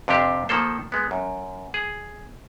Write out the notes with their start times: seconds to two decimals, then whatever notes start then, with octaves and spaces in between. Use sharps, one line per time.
0.08 F2 C3 D4 G4
0.49 D#3 F3 A#3 A4 C5
0.92 G#3 B3
1.11 F#2
1.74 G#4